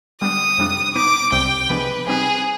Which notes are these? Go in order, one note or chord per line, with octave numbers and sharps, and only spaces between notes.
D3 G3 B3 D4 D#6
F2 C3 G3 D4 F4
B2 B3 D#4 B4 D6
C2 C3 G3 C4 G4 G5
C3 F3 G#3 B3 D4 B4
C3 G3 C4 D#4 G#4 B4